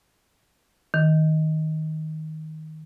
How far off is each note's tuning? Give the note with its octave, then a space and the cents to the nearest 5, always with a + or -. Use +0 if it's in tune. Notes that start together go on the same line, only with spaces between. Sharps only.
D#3 +10